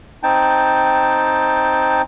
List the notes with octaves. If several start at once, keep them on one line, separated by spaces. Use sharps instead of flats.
C4 D#4 G5 A5